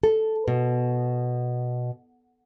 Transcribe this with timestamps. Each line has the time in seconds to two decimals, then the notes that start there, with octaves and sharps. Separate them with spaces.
0.03 A4
0.48 B2